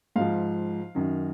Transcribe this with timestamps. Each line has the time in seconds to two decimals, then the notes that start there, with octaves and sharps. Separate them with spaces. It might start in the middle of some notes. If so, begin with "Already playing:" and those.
0.16 G#2 F3 F5
0.95 F#2 D#3 F#3